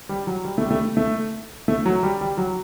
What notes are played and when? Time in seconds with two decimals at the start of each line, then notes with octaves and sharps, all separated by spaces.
0.09 G3
0.27 F#3
0.45 G3
0.58 A3
0.65 G3
0.71 A3
0.97 A3
1.68 A3
1.86 F#3
2.03 G3
2.21 G3
2.38 F#3